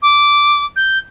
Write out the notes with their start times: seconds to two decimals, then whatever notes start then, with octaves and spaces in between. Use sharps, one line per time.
0.02 D6
0.76 G6